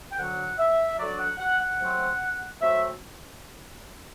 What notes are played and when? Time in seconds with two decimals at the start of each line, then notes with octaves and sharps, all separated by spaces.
0.11 G5
0.17 D2 D3 F#3 F#5
0.58 E5
0.98 D2 D3 F#3 D5
1.19 F#5
1.39 F#5
1.60 F#5
1.80 C3 F#3 A3 C4
2.61 C3 F#3 A3 C4 E5